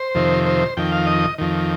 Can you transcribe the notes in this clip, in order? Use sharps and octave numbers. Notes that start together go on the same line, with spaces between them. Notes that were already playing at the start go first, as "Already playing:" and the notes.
Already playing: C5
F2 C3 D#3
C5
F2 D#3 G5
F5
D#5
F2 D#3